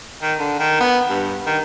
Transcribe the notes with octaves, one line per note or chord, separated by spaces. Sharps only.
D#3
D3
D#3
B3
G2
D#3